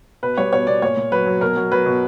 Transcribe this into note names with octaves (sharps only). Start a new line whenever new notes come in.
B2 B4
G3 C#5
B2 C#5
B2 D5
A#2 C#5
A#2
F#3 B4
F#3
B2 A#4
F#3
F#3 B4
B2